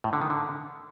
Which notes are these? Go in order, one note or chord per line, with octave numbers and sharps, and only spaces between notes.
A2
D3
D#3
D3